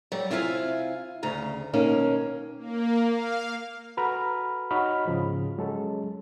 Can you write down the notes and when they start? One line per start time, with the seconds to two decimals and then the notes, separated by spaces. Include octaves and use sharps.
0.12 F#3 G3
0.31 C3 E4 F4 F5 G#5
1.23 D2 C#3 A#5
1.73 B2 D#3 A#3 C#4
2.58 A#3
3.08 F5
3.97 F#4 A4 B4 A#5 B5 F6
4.71 D#4 F#4 C#5 D#5 B5 F6
5.07 G#2 C#3 F3
5.58 F#3 G#3 C#4 A4